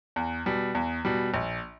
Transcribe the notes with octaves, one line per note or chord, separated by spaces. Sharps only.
E2
B2 G3
E2
B2 G3
A#1